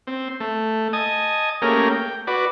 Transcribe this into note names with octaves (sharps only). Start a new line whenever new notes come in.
C4
A3
D#5 G#5 A5 D#6
A3 A#3 C#4 G4 G#4 A#4
G5
F#4 B4 D5